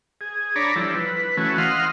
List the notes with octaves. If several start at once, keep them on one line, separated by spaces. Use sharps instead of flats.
G#4
D4 C#5 D5 A#5 B5
F3 G3 E4 A4
B4
E3 A3 C#4 F#4
D#5 F5 F#5 C6 F6